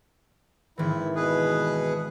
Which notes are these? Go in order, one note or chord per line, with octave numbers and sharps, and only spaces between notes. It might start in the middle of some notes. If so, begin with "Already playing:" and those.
G#1 E3 E4
B2 G#4 B4